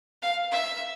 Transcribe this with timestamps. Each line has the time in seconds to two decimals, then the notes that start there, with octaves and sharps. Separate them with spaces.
0.22 F5
0.52 E5